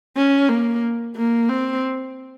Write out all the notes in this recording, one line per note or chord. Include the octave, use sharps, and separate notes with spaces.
C#4
A#3
A#3
C4